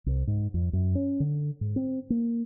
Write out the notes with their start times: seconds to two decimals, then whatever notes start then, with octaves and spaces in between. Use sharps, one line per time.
0.06 C2
0.27 G#2
0.54 F2
0.73 F#2
0.95 C#4
1.20 D3
1.61 G#2
1.76 C4
2.10 A#3